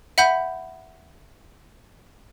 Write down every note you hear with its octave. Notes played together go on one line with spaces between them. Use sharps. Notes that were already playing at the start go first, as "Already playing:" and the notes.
E5 F#5 B5 G6